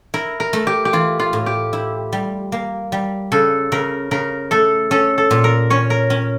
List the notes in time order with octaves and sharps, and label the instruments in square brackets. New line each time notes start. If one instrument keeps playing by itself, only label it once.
[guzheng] E4 [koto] A#4
[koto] A#4
[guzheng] A3
[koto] G4
G4
[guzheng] E3 [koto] F4
[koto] F4
[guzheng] A2
[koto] G4
[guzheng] E4
G3
A#3
G3
[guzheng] C#3 [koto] A4
[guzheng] C#3 [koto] A#4
[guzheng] C#3 [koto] A#4
[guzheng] A3 [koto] A4
[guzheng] C#4 [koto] A4
[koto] A4
[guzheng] A#2
[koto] A#4
[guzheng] C#4 [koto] C#5
[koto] A#4
[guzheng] C#4